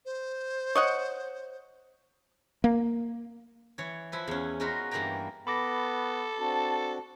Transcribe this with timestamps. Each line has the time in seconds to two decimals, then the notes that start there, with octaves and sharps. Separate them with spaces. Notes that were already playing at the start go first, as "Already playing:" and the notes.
0.05 C5
0.75 C#5 D#5 F#5
2.64 A#3
3.78 E3 C#5
4.12 F3 E4 B4
4.27 E2 C#4
4.60 G#3 D#4 F4 F#4 A#4 B4
4.91 G2 E3 A#3 G4 G5 A#5
5.47 B3 A4 B5 D6 A#6
6.38 C4 D4 F#4 A5